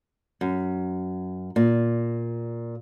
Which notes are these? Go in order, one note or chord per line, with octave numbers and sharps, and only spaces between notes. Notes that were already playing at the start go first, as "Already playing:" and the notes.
F#2
A#2